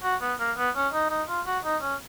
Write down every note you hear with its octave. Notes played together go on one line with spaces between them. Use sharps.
F#4
B3
A#3
B3
C#4
D#4
D#4
F4
F#4
D#4
C#4